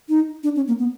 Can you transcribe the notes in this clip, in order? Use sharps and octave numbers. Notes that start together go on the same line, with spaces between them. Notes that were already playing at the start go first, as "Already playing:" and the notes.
D#4
D4
C#4
A#3
B3